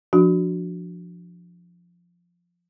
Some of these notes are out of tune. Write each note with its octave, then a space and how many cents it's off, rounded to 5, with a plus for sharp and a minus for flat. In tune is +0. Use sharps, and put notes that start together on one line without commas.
F3 +0 D4 +0 F#4 +0